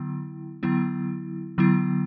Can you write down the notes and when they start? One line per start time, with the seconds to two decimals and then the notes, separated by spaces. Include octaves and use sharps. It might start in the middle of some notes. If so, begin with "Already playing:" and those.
Already playing: D3 F#3 B3 E4
0.63 D3 F#3 B3 E4
1.58 D3 F#3 B3 E4